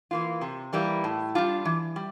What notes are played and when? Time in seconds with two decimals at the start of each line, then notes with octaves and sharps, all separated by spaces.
0.11 E3 A#3 F4
0.42 C3
0.73 E3 G3 A#3 E4
1.04 A2
1.35 G3 D4 F4
1.65 E3
1.96 G3